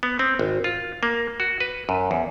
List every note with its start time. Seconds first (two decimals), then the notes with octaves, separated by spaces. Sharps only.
0.03 B3
0.19 C4
0.39 G#1
0.64 F4
1.03 A#3
1.40 F#4
1.60 B4
1.89 F#2
2.11 E2